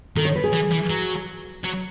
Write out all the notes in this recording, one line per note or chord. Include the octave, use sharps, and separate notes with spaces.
D#3 A4
C#5
B4
G#4
E3
E3
F#3
F#3